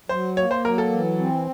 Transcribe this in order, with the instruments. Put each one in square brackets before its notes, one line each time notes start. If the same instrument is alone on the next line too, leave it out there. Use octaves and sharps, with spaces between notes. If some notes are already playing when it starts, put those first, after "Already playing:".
[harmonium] F#3 [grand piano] C5
[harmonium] A#3 [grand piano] C#5
[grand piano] C5
[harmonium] F#3 [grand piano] A#4
[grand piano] A4
[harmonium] E3
C4